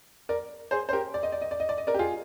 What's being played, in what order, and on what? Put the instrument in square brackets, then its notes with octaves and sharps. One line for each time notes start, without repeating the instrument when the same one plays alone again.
[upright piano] A#4 D5
G#4 C5
C5
G4 A#4
D5
D#5
D5
D#5
D5
D#5
D5
D#5
A#4 D5
G4
F4 G#4